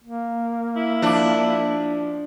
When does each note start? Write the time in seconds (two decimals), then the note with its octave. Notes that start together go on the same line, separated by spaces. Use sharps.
0.04 A#3
0.76 E4
1.02 F3 D4 D6